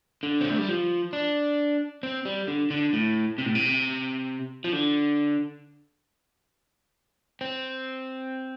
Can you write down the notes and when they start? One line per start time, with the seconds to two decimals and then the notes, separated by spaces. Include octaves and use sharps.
0.23 D3
0.41 C4
0.50 A3
0.58 G3
0.69 F3
1.13 D4
2.03 C4
2.25 G3
2.48 D3
2.70 D3
2.93 A2
3.38 C3
3.46 A2
3.55 C3
4.64 F3
4.73 D3
7.41 C4